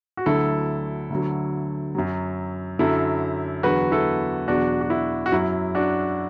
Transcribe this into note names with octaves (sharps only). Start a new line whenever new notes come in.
F#4
D2 D3 F#3 E4 A4
D2 D3 F#3
F#2 F#3
F#2 D3 F#3 E4 A4
E2 D3 F#3 F#4 B4
E4 A4
E2 B2 F#3 D4 F#4
F#4
E4
F#4
F#2 F#3 E4
D4 F#4